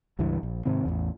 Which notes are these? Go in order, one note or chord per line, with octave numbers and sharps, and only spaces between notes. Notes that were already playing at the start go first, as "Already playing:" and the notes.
C#2 G2 E3
A#1
G#2 C3 D#3 C4
A1 E2